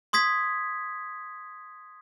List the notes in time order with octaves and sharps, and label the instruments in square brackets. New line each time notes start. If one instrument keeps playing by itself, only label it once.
[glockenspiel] C6 D#6 G#6 B6